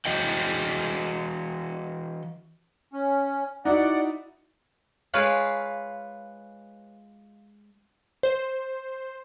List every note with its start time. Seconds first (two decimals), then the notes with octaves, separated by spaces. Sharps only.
0.06 E3 F#4 D#5 G5
2.93 C#4
3.65 D#4 E4 F#4 D5 F#5
5.14 G#3 F4 B4 C#5 F5
8.23 C5